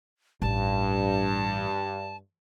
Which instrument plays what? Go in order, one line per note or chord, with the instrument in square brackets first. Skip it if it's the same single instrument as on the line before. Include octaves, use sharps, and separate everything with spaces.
[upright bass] A1 [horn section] G2 [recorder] A5